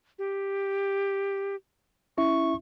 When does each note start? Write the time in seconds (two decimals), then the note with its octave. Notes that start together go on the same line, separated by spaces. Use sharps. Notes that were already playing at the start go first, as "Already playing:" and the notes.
0.19 G4
2.18 C#4 E4 E5 C#6